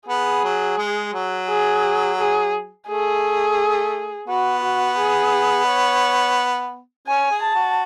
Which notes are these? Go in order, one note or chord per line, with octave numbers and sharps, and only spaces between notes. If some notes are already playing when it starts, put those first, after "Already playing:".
B3 G#4
F#3
G#3
F#3
G#4
G#4
A3 G#4
B3 F#4
F#4
G#4
C#5
C#4 G#5
G#4
A5
F#4